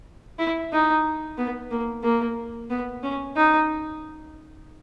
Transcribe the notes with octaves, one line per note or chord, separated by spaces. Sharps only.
E4
D#4
B3
A#3
A#3
B3
C#4
D#4